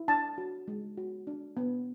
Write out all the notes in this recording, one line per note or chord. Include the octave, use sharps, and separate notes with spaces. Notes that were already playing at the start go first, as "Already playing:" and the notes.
Already playing: E4
D4 A5
F#4
G#3
F#4
D4
B3